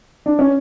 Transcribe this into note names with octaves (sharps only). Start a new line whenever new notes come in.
D4
C#4